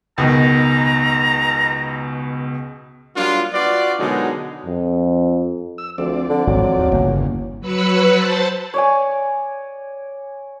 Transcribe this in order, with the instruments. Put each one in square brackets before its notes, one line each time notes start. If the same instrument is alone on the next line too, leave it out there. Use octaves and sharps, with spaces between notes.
[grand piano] C#2 B2 D#3 [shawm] A#5
[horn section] F#3 G3 A#3 D4 F4
F4 F#4 B4 D5
B2 D3 D#3 F#3 G#3 D#4
[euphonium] F2
[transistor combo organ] E6
[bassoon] D2 [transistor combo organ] F3 C4 D5
[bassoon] D3
[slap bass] G#1 [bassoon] F#3
[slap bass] D#2
[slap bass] G1 A#3 [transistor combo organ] E2 C#3
[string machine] F#3 B4 B5 E6 C#7
C5 A5 A6
[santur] C#5 D5 G#5